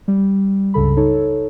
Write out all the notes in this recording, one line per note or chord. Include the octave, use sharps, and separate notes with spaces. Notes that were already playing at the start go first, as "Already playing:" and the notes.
G3
C#2 G2 C#3 A4 B5
D#4 A4 C#5